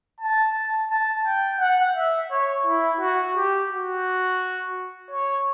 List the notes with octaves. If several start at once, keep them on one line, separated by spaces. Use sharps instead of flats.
A5
A5
G5
F#5
E5
C#5
E4
F#4
G4
F#4
C#5